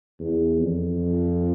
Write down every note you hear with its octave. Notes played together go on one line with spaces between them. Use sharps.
E2
F2